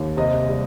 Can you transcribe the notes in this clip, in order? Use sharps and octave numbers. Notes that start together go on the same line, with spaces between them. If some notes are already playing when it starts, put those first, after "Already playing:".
Already playing: D#2
C3 D#5
G3